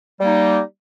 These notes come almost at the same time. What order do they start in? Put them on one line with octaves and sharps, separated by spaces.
G3 A#3 D#4